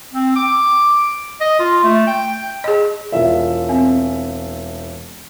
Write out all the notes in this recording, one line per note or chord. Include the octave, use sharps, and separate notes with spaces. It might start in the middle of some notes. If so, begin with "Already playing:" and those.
C4
D6
D#5
F4
A3
G5
G#4 D#5
E1 F4 E5
C4